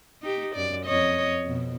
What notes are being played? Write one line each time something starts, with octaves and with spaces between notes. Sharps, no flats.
D#4 G4
F#2 D5
F2 C#5 D#5
F2 B2